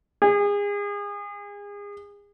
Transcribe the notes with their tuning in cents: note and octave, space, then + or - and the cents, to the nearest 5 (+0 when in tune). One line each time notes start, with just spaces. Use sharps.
G#4 -30